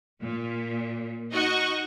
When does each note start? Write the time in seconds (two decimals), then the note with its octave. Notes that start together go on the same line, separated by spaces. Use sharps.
0.22 A#2
1.33 D#4 F#4 D#5 C#6